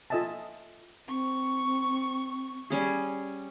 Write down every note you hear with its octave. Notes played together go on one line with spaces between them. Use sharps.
F4 A4 D#5 E5 G#5 A5
C4 C#6
G3 C#4 G#4